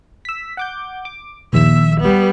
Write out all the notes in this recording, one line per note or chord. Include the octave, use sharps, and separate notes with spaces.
E6 B6
F#5 D6 G6
D6
A#1 D#2 E5 E6
G3 B3